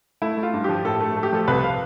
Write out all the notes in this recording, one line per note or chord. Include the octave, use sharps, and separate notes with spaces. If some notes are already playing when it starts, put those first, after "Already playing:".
A3 E4
A3
F4
G2
F3 G4
A2 A4
A3
A3
G4
F3 A4
C2 B4
F5